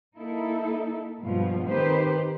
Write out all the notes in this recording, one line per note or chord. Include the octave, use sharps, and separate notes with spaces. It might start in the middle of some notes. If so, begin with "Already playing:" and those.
A#3 D#4 E4 A4
G2 B2 F3 G#3 F4
D#3 C4 G4 B4 C5